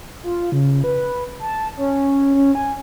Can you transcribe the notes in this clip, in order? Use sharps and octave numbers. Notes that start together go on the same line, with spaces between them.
F4
C#3
B4
A5
C#4
C#4
G#5